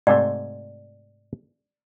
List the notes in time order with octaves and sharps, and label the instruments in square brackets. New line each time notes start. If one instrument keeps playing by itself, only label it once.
[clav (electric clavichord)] G#2 C3 A3 [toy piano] D5